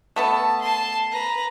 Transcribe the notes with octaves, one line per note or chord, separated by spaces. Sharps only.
A3 B3 A4 A5
A5 C6
B4 A#5